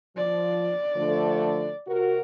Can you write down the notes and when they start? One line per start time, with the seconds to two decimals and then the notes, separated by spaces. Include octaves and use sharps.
0.17 F3 D5
0.96 D3 F3 A3
1.87 C3 F#4 A#4